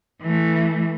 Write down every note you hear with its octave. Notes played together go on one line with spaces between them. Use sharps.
E3 A3